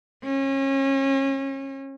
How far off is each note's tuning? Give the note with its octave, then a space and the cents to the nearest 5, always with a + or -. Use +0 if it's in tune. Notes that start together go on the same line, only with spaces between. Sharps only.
C#4 -30